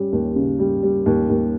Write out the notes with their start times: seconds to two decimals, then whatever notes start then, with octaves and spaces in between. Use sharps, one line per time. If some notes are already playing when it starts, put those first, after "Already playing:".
Already playing: G3 C#4
0.12 D#2
0.36 C#3
0.59 G3
0.83 G3
1.06 D#2
1.29 D#2